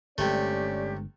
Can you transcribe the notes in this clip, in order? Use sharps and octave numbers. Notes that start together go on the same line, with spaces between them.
G1 C3 G#3 A3 C#4 G4 D5